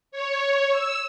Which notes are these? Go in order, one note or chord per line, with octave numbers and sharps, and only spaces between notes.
C#5
E6